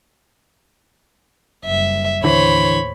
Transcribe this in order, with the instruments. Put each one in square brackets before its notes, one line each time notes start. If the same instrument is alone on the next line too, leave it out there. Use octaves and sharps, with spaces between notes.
[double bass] F#1 G3 [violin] E5
[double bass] D#2 A2 [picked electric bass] D3 E3 [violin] C5 C#5 [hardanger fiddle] B5